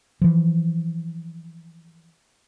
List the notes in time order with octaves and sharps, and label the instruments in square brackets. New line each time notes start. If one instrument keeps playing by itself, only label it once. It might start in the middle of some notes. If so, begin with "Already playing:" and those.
[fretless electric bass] E3 F3